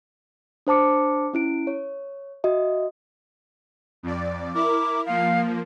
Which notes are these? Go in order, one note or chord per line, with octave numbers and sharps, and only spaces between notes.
D4 C5 A5 D6 C#7
C#4 E4 D7
C#5
F#4 D#5 E5
F2 D5
E4 A#4 D6
F3 A#3 F5